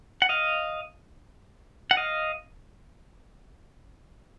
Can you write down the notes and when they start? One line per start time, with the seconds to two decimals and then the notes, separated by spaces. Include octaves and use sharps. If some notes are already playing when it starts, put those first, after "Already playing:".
0.22 F#5
0.29 D#5 F5
1.91 F#5
1.97 D#5 F5